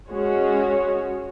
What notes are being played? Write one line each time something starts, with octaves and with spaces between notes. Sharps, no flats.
G#3 C#4 F#4 C#5